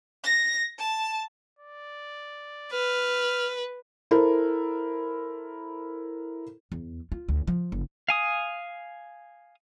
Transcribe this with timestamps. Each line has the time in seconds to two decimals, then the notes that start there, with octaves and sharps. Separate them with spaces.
0.23 A#6
0.80 A5
1.59 D5
2.72 B4 F6
4.11 E4 A4 A#4 C5
6.72 E2
7.12 F4
7.29 D2
7.47 F3
7.72 F#1
8.09 F5 G#5 D#6